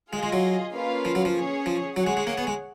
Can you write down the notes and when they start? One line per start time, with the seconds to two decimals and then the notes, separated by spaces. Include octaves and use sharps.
0.13 G#3 F4 G#4 D#5
0.23 G#3
0.33 F#3
0.74 A#3 C#4 F4 B4 F5
1.05 F3
1.15 F#3
1.25 F3
1.35 C#4 G#4 C#5
1.66 F3
1.96 F#3 G#4 C#5 F#5
2.07 G#3
2.17 G#3
2.27 A#3
2.38 B3
2.47 G#3